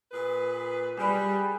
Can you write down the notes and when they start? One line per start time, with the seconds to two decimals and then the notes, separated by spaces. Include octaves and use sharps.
0.12 A#2 G#4 B4
0.97 G3 G#4 B4